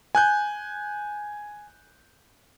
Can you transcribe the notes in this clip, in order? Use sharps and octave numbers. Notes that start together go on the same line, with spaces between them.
G#5 F#6 G6